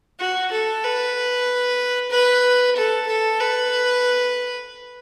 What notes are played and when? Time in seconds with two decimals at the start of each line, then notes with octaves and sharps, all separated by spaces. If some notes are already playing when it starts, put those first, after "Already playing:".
0.19 F#4
0.52 A4
0.84 B4
2.11 B4
2.76 A4
3.08 A4
3.40 B4